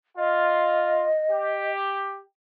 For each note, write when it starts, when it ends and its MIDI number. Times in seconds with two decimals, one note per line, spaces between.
0.18 1.08 65
0.18 1.71 75
1.31 2.20 67